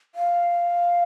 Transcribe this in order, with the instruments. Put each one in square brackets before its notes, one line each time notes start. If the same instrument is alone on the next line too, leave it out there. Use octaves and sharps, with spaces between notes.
[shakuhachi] F5